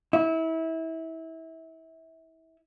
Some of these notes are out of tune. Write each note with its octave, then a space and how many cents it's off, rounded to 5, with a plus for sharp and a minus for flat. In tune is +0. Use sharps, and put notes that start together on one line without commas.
E4 -25